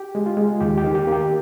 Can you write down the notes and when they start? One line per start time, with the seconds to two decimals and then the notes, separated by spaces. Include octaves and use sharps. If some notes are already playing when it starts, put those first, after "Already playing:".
Already playing: G4
0.15 G#3
0.26 F4
0.37 G#3
0.60 D#2 G4
0.78 G4
0.84 D#3
0.95 G4
1.07 A#3 G4